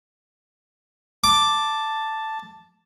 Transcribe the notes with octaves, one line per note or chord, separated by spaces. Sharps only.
A5 D6